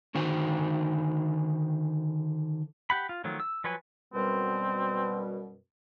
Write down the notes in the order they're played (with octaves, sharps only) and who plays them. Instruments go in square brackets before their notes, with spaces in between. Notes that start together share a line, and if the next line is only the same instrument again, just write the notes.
[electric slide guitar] D3 D#3 D#4 F#4 C5 G5
[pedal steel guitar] G4 F#5 B5
F4
D#3 F3 F#3 A3
E6
F3 F#3 B4 C#5 G#5
[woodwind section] F#2 B2 G3 [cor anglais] C4